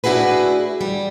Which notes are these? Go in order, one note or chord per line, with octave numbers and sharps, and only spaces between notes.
A3 D4 E4 F#4 G#4 B4
G3